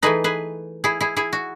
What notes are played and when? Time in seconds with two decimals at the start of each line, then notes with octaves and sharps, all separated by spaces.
0.02 E3 A3 D#4 G#4 B4
0.24 G#4 B4
0.84 E4 G#4
1.00 E4 G#4
1.16 E4 G#4
1.33 F#4